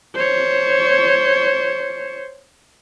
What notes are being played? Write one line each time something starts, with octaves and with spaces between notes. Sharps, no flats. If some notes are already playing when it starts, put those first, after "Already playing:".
C5 C#5